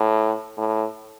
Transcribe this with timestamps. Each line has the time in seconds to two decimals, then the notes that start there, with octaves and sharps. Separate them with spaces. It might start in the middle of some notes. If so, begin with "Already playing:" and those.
Already playing: A2
0.58 A2